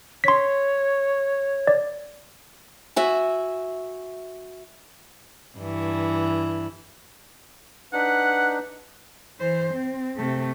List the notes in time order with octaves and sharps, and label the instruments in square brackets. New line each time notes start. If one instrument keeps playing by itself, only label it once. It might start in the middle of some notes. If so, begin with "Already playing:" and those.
[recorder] C#5 [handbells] C6 B6
[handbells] D5
[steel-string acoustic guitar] F#4 E5 G#5
[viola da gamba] G2 E3
[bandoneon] D4 D#4 [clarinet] B4 [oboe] F#5
[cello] E3 C5
C4
C3 A3